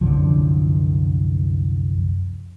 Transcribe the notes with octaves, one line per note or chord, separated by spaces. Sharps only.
C2 F#2 D3 F3